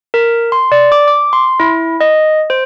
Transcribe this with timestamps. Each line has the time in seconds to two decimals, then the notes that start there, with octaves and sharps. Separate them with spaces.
0.14 A#4
0.52 C6
0.72 D5
0.92 D6
1.08 D6
1.33 C6
1.60 E4
2.01 D#5
2.50 C5